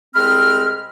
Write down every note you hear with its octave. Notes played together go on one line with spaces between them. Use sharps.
C2 G#3 C4 B5 F6